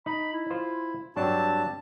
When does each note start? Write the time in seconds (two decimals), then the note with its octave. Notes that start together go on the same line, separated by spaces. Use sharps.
0.06 D#4 B5
0.33 E4
0.50 F4 C5
1.16 G2 F#3 C4 D4 A5